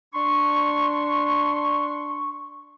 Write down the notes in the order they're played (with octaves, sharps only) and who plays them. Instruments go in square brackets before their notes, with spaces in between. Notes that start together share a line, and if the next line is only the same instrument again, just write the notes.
[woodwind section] D4 C6 C#6